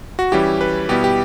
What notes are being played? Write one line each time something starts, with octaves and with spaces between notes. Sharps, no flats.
F#4
E3 G3 C#4 E4 G4
B4
B2 G3 B3 E4 G4
G4